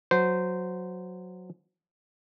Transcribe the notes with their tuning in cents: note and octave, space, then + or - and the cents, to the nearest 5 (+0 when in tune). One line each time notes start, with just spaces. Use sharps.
F#3 -10 C5 -15